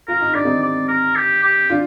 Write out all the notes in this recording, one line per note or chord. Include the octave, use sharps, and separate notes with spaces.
F4 A#4
D#4
D4 D5
C4 D#4
D5
A#4
G4
G4
D4 F4